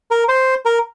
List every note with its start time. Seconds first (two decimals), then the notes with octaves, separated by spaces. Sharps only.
0.11 A#4
0.29 C5
0.66 A#4